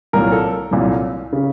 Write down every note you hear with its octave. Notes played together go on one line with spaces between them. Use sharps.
C2 A#2 F#3 A#4
A4
C2 A#2 F#3
C#3